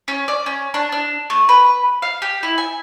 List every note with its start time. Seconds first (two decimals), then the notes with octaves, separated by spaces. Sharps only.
0.08 C#4
0.28 D5
0.46 C#4
0.74 D4
0.92 D4
1.30 A3
1.49 B4
2.02 F5
2.22 G4
2.43 E4
2.58 G#5